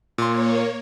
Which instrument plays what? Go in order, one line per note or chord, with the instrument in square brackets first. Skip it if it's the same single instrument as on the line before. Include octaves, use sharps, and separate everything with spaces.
[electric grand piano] A#2 C6 [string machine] A#3 C#5